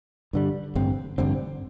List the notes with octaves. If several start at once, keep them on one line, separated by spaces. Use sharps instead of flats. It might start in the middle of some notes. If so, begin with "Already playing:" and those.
G2 D3 G3
A1 G2 D3 C4
A1 G2 D3 C4